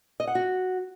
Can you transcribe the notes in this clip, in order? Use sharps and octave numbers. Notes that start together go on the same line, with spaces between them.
D#5
F#5
F#4